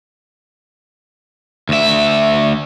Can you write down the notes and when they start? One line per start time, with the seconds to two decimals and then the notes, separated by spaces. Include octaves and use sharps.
1.69 D2 E5